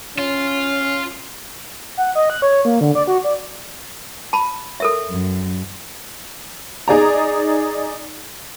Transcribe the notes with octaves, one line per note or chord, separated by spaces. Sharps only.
C#4 F4
F#5
D#5
F#6
C#5
A#3
D3
D5
F#4
D5
A5 B5
A4 A#4 E5
F#2
D#4 G#4 D5 A#5